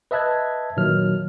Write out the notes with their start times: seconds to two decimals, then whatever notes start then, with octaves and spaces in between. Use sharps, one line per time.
0.11 B4 D#5 E5 A5 F#6 G#6
0.77 A#2 D#3 F#3 F6